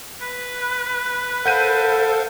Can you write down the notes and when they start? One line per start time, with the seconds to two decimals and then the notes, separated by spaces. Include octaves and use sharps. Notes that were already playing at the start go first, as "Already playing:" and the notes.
0.21 B4
1.45 A4 A#4 C5 F5 F#5 G6 D#7